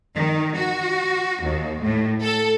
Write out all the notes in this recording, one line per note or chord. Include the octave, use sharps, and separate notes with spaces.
D#3
F#4
D#2
A2
A4